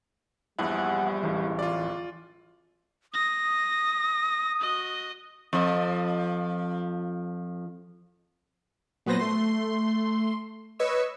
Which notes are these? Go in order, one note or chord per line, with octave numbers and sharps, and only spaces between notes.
A#1 E2 G2 G3 E4 F#5
D1 C#2 E3
F4 D5
D#6 A#6
F#4 D#5
F2 F3
A#2 F#3 B3 B4 C5 A#6
A3 C6
B4 C#5 D#5 C#6 E6